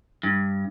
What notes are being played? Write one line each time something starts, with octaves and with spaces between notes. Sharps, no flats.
G2